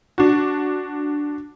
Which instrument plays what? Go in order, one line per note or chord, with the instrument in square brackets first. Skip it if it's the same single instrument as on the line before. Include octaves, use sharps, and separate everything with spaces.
[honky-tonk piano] D4 F#4